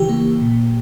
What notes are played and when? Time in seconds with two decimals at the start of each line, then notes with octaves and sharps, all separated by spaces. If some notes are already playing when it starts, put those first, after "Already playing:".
Already playing: C#3 E3 G4
0.09 A#3
0.41 A#2